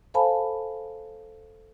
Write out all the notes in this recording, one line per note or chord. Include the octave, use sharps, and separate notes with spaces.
A4 C5 F5 G#5 A5 B5